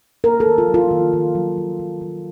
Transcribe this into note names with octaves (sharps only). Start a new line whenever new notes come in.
A#3 A#4
A4
D#3
F4
F#3
F4
D#3
D#3
F#3
D#3
D#3
D#3